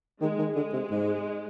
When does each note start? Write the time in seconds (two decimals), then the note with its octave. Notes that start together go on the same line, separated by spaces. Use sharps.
0.21 D#3 G#3
0.38 D#3
0.56 D3 G#3
0.73 C3
0.90 G#2